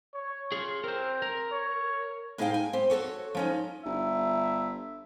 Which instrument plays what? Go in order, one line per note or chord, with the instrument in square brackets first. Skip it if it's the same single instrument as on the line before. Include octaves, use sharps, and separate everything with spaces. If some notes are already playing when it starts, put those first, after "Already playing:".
[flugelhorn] C#5
[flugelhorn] F4 [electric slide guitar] G#4 C#5
[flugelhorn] C4 [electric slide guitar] A#4 C5
[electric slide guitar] A#4
[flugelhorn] C#5
[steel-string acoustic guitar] A2 D#4 G#4 E5 F5 G5
G#5
C4 G4
F#4 G4 A4 C#5
F3 C#4 D#4
[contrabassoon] G1 [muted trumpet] E5